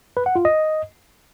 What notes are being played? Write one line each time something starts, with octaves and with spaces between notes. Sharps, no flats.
B4
F#5
F4
D#5